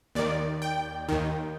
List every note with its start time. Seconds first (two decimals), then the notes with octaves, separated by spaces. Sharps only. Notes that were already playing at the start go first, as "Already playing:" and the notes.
0.15 D#2 D#3 D5
0.62 G5
1.09 D#2 D#3